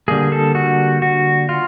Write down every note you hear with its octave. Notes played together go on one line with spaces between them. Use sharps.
D3 G3 A#3 G#4
A4
F#4
F#4
F4